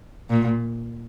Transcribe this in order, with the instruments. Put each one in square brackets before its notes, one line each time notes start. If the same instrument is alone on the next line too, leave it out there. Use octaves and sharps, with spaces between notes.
[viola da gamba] A#2